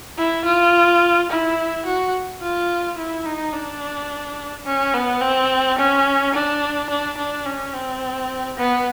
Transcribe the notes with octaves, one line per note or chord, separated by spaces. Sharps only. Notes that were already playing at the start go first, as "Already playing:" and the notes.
E4
F4
E4
F#4
F4
E4
D#4
D4
C#4
B3
C4
C#4
D4
D4
D4
C#4
C4
B3